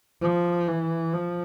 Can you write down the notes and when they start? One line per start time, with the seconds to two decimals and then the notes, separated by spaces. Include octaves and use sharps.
0.22 F3
0.68 E3
1.13 F3